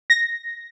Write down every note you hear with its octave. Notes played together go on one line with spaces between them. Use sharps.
A#6